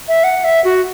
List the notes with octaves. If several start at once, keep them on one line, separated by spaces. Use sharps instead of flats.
E5
F#5
E5
F#4